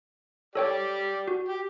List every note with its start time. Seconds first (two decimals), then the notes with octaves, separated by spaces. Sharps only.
0.55 G4 A4 C#5 D5 G5
1.28 F#4
1.48 G4